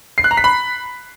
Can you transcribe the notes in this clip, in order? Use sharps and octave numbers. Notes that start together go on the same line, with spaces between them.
C7
F#6
A#5
B6
B5